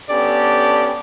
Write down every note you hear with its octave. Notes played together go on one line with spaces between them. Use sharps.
B3 C#4 D4 G4 A4 D5